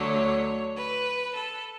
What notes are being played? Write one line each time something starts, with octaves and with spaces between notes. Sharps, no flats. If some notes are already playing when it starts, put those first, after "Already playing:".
Already playing: D2 D3 F#3 A3 C#5
B4
A4